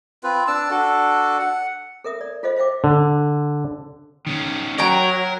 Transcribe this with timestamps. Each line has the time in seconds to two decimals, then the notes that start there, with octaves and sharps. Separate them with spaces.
0.23 C4 F4 B4
0.47 D4 A5 E6
0.70 D4 F#4 A4
1.39 F#5
2.04 A4 A#4 E5 D#6
2.21 D5
2.43 F4 A4 C5 D#5 F5
2.56 C5 E5 F5 G5 D6
2.84 D3
4.27 D#3 C#4
4.78 F#3 A#4 C#5 G5 A#5